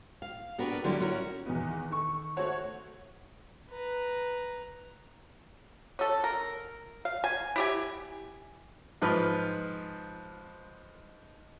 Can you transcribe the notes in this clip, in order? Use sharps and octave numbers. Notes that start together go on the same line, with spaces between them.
F5
B3 D4 F#4 G4 A#4 B4
D3 F#3 G3 A#3 D#4 E4
C#4 E4 F#4 A#4
E2 D#3 B3
D#3 A4 C#6
A3 F#4 A4 C5 C#5 F#5
B4 A#5
C#4 A4
A#4
F5
G#5
E4 G4 G#5
G#2 F3 B4 F6